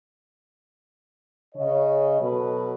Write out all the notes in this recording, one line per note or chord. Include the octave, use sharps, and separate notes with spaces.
C#3 C#5 D#5
B2 F#3 B3 A4 B4